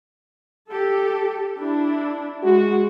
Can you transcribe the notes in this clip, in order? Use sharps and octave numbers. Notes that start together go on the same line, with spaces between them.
G4 A4
D4 E4
G#3 F#4